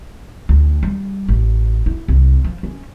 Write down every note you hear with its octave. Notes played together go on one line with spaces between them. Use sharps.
D2
G3
A1
E4
C2
F3
C#4